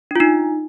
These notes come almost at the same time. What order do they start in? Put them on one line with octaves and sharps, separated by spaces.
D4 F4 D#4